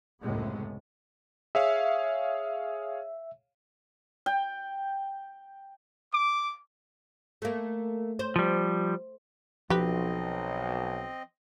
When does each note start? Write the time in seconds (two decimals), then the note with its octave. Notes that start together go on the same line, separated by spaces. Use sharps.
0.22 C#2 F#2 A2 C3 G#3 B3
1.55 G#4 C#5 E5 F5
4.26 G5
6.14 D6
7.42 A3 A#3
8.19 C5
8.36 F3 G3
9.70 B1 F3 C4 G4 B4 D#5